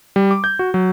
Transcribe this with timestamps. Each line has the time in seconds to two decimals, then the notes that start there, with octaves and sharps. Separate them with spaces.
0.16 G3
0.31 D6
0.44 G6
0.59 F#4
0.74 F#3